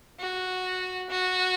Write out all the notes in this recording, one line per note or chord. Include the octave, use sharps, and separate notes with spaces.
F#4
F#4